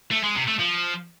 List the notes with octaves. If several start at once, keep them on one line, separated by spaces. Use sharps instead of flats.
A3
G#3
C3
A3
F3